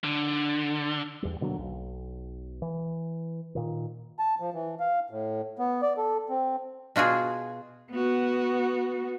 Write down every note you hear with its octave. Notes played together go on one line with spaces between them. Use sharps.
D3
E2 G3
B2 D3 F#3 A#3
B1
E3
A#2 D#3
A5
F3
E3
F5
A2
B3
D5
A4
C4
B2 F4 F#4 G#4
B3 F#4